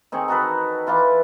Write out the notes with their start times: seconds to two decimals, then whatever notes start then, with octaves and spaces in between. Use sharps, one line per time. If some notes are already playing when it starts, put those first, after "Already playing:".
0.12 D#3 C4 G#4 C#6
0.28 D#4 F#4 A4 B4
0.87 E3 F4 B5 D6